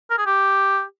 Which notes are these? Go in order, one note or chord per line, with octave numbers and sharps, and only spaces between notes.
A#4
G#4
G4